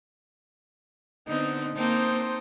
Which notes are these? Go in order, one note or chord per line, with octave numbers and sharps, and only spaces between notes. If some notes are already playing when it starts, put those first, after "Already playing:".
D3 B3 C4 D#4
A#3 C4 D#4 A4 C5 G5